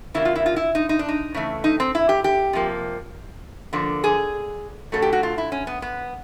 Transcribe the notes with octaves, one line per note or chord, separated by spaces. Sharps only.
C#3 E3 G3 A#3 E4
F4
E4
F4
E4
D#4
D#4
D4
D#4
C#3 E3 A3
D#4
C4
E4
G4
G4
C3 F3 A#3
D3 F3 A#3
G#4
C#3 F#3 A3 A4
G4
F#4
F4
E4
C#4
B3
B3